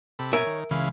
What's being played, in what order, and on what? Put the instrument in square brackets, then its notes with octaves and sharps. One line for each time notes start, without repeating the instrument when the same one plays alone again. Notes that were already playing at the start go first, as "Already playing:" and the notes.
[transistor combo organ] C3 A4 B5
[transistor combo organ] B2 [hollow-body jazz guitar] A#4 E5 G#5 [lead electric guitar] C#5
[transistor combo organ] D#3
[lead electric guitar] C#2 E3 [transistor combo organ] C#3 E4 F5